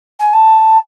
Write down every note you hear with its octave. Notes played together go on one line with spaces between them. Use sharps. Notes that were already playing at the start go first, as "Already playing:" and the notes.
G#5
A5